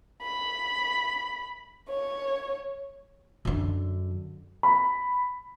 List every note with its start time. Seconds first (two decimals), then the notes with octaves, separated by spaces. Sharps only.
0.22 B5
1.88 C#5
3.45 F#2 D3
4.63 B5